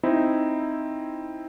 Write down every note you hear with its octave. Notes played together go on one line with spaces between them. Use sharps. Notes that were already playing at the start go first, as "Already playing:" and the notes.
C4 D#4 E4